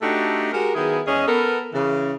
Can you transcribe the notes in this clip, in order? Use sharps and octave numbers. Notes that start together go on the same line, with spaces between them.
A3 D4 D#4 F#4 G4 A4
G#3 F#4 G4 A#4
D#3 F#3 B3 E4 G#4
E2 G#3 C#4 G#4 D#5
B3 A4 A#4
C#3 E3